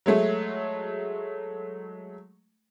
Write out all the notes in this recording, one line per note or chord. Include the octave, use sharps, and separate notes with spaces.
F#3 G#3 A3